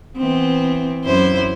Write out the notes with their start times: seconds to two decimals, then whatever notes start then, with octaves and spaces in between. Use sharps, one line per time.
0.17 E3 B3 C4
1.05 F#2 E4 C5